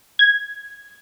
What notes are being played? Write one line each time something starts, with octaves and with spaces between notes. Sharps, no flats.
G#6